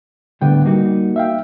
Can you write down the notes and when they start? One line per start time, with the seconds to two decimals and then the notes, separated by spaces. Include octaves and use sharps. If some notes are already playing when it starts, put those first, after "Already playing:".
0.41 A2 D3 G3 B3 F#5 G5
0.65 G3 A#3 D#4 F#4
1.16 E5 F5 G5